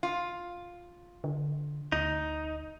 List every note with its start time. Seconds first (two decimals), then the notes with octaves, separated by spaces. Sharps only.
0.03 F4
1.24 D3
1.92 D2 D#4